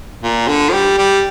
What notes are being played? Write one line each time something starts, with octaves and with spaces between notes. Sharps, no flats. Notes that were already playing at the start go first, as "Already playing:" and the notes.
A#2
D3
F3
G3
G3